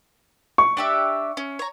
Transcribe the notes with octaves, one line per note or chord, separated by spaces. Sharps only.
C#6
D4 G4 E5
C#4
C#5 A#5